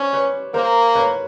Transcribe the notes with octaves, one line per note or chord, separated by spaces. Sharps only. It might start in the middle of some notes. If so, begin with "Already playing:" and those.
Already playing: C#4 C5 D5
B4 C#5
A#3 A#4 C5
B4 C#5